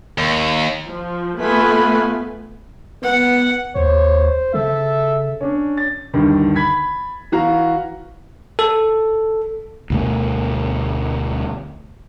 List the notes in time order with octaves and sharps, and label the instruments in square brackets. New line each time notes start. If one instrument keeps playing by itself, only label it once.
[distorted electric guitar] D#2
[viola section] F3
A3 B3 F4 B4 G#5 B5
[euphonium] B3 [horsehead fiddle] F#5
[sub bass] D#2 [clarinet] C5 [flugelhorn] C#5
[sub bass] C#3 [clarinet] A4 [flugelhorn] E5
[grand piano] C#4 D4
A6
D2 G2 D#3
B5 G#6 B6
E3 F#4 F5 A#5
[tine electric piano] A4
[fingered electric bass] D2 B2 A3